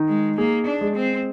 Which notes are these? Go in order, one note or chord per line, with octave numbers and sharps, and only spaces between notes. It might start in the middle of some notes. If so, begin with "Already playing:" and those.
Already playing: D#3 D#4
G#3
A#3 G#4
D4
G#3
C4